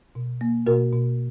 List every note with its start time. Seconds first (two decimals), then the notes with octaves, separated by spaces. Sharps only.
0.15 B2
0.41 A#3
0.67 B2 F#4 A#4
0.93 B2